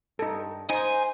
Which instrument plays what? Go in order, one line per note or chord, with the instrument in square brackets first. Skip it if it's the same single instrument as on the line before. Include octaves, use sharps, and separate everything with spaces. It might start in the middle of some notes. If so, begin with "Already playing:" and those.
[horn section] G2 [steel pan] D#4 A4
[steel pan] D#4 [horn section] C5 [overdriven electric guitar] G#5